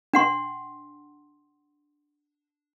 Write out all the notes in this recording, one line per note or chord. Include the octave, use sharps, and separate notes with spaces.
D4 F#5 C6